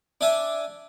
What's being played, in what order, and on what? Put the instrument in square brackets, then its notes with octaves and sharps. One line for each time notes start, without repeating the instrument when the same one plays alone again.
[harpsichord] D4 E5 G#5